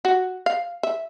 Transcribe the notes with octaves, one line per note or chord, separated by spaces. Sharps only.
F#4
F5
E5